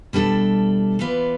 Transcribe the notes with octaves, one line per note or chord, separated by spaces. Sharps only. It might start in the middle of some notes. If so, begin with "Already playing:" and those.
B2 G3 D4 A4 E5
E3 B3 F4 B4 D5